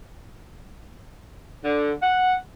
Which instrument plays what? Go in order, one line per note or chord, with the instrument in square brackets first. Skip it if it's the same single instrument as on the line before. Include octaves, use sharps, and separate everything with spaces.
[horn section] D3
F#5